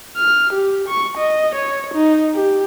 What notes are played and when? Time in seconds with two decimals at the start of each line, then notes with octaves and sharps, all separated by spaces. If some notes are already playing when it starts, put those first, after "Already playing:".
0.17 F6
0.53 G4
0.88 C#6
1.18 D#5
1.55 C#5
1.94 D#4
2.35 G4